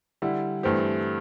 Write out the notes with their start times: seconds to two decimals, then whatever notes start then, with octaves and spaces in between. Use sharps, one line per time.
0.22 D3 G3 E4
0.63 G2 E3 A3 C4 G4